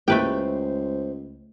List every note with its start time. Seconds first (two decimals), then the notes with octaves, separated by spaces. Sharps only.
0.08 C#2 A3 A#3 E4 G4 B4 C5 G5